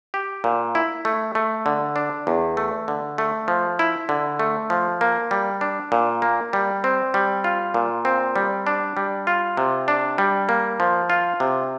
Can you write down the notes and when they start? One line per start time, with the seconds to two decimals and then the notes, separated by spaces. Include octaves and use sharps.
0.14 G4
0.44 A#2
0.75 E4
1.05 A3
1.35 A3
1.66 D3
1.96 D4
2.27 E2
2.57 A3
2.88 D3
3.18 A3
3.48 F3
3.79 E4
4.09 D3
4.39 A3
4.70 F3
5.01 A#3
5.31 G3
5.61 D4
5.92 A#2
6.22 A#3
6.53 G3
6.84 C4
7.14 G3
7.44 F4
7.74 A#2
8.05 C4
8.36 G3
8.67 D4
8.97 G3
9.27 F4
9.57 C3
9.88 D4
10.18 G3
10.49 A#3
10.80 F3
11.10 F4
11.40 C3